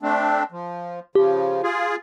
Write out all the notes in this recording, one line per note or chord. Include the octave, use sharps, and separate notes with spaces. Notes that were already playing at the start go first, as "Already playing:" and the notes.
A3 C4 D4
F3
C#3 F3 G4
F4 G#4